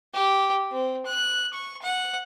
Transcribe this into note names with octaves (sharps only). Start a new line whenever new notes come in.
G4
C4
F#6
C#6
F#5